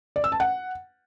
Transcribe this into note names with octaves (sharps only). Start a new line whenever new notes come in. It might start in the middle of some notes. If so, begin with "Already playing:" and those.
D5
E6
A5
F#5